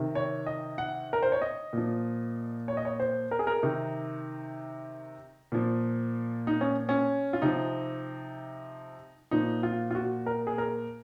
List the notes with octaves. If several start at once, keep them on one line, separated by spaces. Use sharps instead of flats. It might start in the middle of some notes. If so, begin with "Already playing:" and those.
Already playing: C3 D#3
C#5
D#5
F#5
A#4
C5
C#5
D#5
A#2 F3
C#5
D#5
C#5
C5
A#4
G#4
A#4
C3 D#3 D#4
A#2 F3
D#4
C#4
C#4
F4
C3 F3 D#4
A#2 F3 D#4
F4
F4
F#4
A#4
G#4
A#4